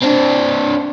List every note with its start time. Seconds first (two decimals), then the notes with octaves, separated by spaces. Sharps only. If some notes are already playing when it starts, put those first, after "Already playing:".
0.03 C4 D4